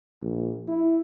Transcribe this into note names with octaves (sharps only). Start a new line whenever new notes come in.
A#1
E4